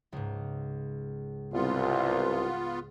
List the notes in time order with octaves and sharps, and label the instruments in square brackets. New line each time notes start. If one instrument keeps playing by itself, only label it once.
[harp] C#2 G#2
[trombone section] C2 [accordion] B3 F4